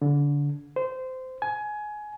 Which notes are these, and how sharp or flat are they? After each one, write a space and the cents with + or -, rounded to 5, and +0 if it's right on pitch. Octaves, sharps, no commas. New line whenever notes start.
D3 -25
C5 -20
G#5 +20